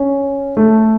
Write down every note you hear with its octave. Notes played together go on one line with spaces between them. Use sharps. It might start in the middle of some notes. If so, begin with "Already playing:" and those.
Already playing: C#4
A3